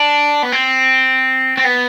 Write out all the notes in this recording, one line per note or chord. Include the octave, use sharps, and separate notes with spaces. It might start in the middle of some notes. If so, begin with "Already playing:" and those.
Already playing: D4
B3
C4
C4
B3